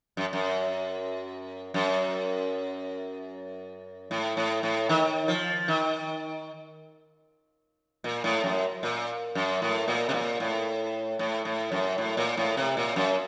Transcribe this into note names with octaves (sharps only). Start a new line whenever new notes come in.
F#2
F#2
F#2
A2
A2
A2
D#3
F3
D#3
A#2
A2
F#2
A#2
F#2
A2
A#2
C3
A#2
A2
A2
A2
F#2
A2
A#2
A2
C3
A#2
F#2